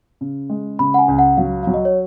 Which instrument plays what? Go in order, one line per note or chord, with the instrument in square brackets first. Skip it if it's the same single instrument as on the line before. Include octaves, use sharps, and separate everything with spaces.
[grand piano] C#3
G#3
[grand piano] C#3 [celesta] B5
[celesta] F#5
G#5
[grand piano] C#2
[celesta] F#5
[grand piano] F#3 [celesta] F5
[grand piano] F#3 [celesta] F5
[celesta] D#5
C#5